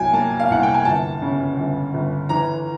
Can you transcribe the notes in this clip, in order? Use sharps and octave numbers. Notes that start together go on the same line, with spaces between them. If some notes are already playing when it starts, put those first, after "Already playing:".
Already playing: C2 F#3 G5 G#5
A#3 A5
F5
C2 F#5
G5
G#5
G1 A5
C#3
G1
G1
E3 A#5